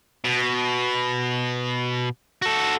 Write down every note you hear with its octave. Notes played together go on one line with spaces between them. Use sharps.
B2
F#4 A4